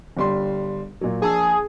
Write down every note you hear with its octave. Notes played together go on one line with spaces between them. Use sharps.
G1 G3 C6
A#2 F#3
A#1 G#4 A5 E6